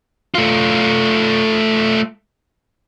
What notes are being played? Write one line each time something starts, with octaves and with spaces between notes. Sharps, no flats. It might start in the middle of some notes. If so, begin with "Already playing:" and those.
A3 F4